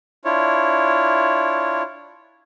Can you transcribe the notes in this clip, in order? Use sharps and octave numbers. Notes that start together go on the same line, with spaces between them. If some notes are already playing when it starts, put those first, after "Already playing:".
D4 E4 F4 C#5